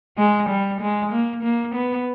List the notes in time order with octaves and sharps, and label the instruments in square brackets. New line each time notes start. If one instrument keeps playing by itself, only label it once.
[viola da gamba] G#3
G3
G#3
A#3
A#3
B3